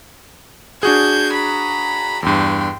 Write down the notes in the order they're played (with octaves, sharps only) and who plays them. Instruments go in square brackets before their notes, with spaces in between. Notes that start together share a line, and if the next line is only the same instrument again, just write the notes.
[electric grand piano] D4 F#4 G#4 [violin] G6 G#6
[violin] A#5 B5
[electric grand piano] E2 G2 [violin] G5 C6